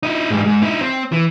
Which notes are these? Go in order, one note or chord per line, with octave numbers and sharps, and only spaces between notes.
D#4 E4
G#2 G3
G#2
D#4 E4
C4
E3